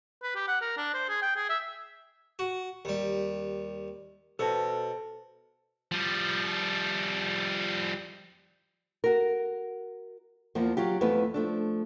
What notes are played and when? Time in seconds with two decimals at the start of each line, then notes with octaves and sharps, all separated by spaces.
0.23 B4
0.36 G4
0.48 F#5
0.61 A#4
0.77 D4
0.94 C5
1.08 G#4
1.22 G5
1.36 G#4
1.49 E5
2.39 F#4
2.85 D#2 G3
4.39 B2 A4 C5 A5
5.92 F3 G3
9.04 F#4 A#4
10.55 E2 F3 A#3
10.77 F#3 F4 G4
11.01 F2 E3 A3 B3 B4
11.34 F3 A3 D4